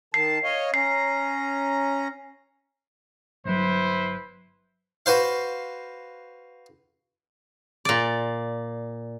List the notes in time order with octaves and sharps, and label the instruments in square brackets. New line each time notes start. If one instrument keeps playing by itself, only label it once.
[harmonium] D#3 A5 [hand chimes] C7
[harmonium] C#5 D#5 F5
[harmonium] C#4 A#5 [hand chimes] C7
[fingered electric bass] G1 F#3 [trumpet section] E4 B4 C5
[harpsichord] F#4 B4 C5 F5
[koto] A#2 D5